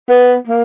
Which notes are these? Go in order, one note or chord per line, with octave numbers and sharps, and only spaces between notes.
B3
A#3